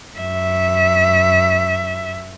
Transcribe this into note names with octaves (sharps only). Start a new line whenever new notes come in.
F#2 E5